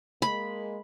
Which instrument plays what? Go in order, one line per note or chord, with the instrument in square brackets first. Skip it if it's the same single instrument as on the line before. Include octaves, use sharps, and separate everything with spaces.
[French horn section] G#3 A#3 [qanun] B5